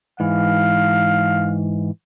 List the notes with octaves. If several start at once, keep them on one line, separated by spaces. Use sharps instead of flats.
G#2 E3 F5